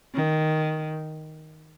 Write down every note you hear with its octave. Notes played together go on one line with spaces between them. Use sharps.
D#3